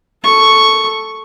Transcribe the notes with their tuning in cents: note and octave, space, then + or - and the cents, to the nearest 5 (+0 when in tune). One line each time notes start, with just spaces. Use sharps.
A4 +0 C#6 +0